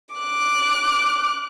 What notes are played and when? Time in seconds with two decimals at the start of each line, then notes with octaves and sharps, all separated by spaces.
0.15 D6 F#6